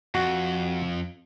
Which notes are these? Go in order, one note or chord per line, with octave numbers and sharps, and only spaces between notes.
F2 F#4